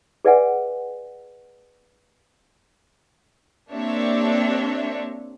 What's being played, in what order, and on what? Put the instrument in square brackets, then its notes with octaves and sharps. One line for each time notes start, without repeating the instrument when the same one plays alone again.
[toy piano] G#4 B4 D5 E5 F#5 G#5
[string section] A#3 C4 D4 G4 C#5 E5